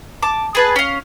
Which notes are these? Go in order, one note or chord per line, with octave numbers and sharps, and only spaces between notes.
A5 D6
G#4 B4 A5
C#4 F5